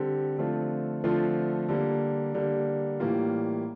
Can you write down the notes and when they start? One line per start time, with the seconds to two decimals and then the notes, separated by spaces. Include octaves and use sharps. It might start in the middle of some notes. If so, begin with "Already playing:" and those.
Already playing: D3 G3 C4 G4
0.38 D3 F3 A3 C4 F4
1.04 D3 F3 A3 C4 F4
1.69 D3 G3 A#3
2.34 D3 G3 A#3
3.00 A2 E3 G3 A#3 F4